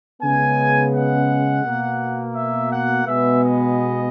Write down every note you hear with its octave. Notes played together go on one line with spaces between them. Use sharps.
C#3 G#3 B3 G#5
F#5
B2 A#3
E5
F#5
B2 G#3 B3 E5
D#5